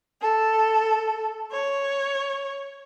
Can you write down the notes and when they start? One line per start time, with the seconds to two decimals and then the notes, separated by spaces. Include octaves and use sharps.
0.21 A4
1.51 C#5